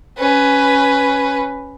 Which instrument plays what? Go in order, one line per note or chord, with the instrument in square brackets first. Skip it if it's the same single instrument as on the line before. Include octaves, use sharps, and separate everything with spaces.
[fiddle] C#4 B4